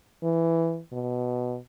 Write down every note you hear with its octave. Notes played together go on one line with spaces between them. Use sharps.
E3
B2